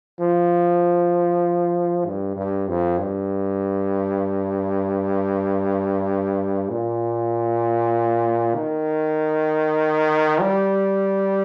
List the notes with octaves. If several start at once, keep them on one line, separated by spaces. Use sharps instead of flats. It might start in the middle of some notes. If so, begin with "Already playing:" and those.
F3
G2
G2
F2
G2
A#2
D#3
G3